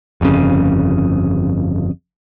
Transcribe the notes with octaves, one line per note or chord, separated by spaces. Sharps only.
G1 F2 A2 C#3